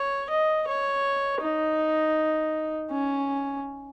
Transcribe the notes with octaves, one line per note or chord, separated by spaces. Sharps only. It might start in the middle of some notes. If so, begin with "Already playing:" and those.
Already playing: C#5
D#5
C#5
D#4
C#4